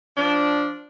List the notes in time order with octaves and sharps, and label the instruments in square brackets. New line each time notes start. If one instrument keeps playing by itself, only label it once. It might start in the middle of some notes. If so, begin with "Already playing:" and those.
[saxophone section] F3 D4